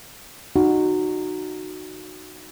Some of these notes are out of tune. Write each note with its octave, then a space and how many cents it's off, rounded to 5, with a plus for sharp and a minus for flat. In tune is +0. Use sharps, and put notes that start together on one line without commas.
D#4 -20 F#4 +0